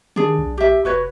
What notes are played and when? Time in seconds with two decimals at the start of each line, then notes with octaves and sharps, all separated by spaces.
0.16 D#3 D4 G#4
0.38 B1
0.58 G4 E5
0.85 F1 F#4 B4 C#5